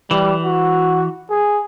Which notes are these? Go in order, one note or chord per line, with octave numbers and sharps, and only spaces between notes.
E3 G3
F#4
G#4